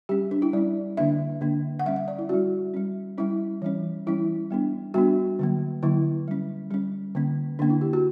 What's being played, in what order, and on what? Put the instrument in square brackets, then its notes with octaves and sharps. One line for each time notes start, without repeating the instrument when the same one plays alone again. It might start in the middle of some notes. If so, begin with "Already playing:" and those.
[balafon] G3 C#4 G4
D4
E4
G3 C#4 D5
D3 A#3 D4 E5
D3 A#3 D4
F#5
G3 C#4 E5
E5
D5
E4
G3 C#4 F#4
G3 C#4
G3 C#4 E4
E3 G3 C#4
E3 G3 C#4 E4
G3 B3 D4
G3 B3 D4 F#4
D3 F#3 A#3
D3 F#3 A#3 E4
G3 C#4
G3 C#4
D3 A#3 C#4
D3 A#3 C#4 D4
E4
G4
F#4